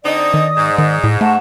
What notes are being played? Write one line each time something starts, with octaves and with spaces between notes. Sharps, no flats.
D3 C4 D#4 D5 D#5 D#6
D#3
G#2
D#3
A2
A3 F#5 A5 C#6